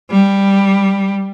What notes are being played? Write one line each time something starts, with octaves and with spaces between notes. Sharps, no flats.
G3